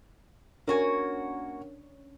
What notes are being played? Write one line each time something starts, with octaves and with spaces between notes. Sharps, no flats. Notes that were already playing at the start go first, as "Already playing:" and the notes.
A#3 C#4 D4 F#4 A#4 C#5 G#5